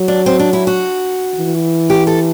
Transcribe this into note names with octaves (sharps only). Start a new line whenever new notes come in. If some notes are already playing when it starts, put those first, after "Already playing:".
Already playing: F#3
D4
C4
D4
E4
F#4
E3
G4
A4